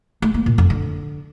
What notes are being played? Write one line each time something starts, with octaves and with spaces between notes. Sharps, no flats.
A3
A#3
A#2
F2
D3